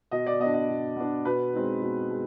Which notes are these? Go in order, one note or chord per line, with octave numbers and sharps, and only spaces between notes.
B2 D#5
D5
B3 D4 D#5
D#5
B2
B3 D4
B2 B4
G#3 C4 D#4
B2
G#3